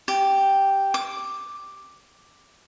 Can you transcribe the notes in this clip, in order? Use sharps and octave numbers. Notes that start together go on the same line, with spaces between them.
G4
D6